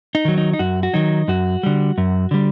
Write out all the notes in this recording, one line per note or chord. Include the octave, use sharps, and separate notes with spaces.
D#4
D#3 F#3
D#4
D#4
F#2 F#4
F#4
D#3 F#3 D#4
F#2 F#4
D3 G3
F#2
D3 G3